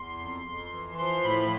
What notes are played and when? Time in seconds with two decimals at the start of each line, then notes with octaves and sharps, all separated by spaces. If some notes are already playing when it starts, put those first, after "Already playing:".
Already playing: E2 C6
0.19 F2
0.46 F2
0.72 E3
0.98 F3 C6
1.23 A2 B5